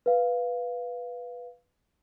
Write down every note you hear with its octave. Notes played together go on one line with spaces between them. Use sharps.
B4 F5